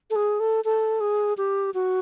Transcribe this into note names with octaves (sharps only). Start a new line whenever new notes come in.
A4
G#4
A4
A4
G#4
G4
F#4